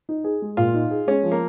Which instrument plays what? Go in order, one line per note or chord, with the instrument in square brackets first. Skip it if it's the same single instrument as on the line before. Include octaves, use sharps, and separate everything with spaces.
[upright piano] D#4
G#4
G#3
[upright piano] A#2 [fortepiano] F4
[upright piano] D#4
G#4
[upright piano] G#3 [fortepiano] C#4
[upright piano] F3
[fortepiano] A#3